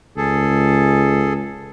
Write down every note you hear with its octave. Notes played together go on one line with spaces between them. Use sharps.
C#2 G#4 A4